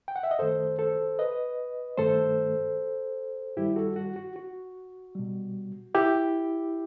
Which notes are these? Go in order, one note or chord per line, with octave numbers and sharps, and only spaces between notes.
G5
F#5
E5
D#5
F#2 D#3 A3 A4 C5
A4 C5
B4 D#5
G2 D#3 A3 A4 C5
G2 D#3 G3 E4 G4
F#4 A4
F#4
F#4
F#4
B2 G3
E4 G4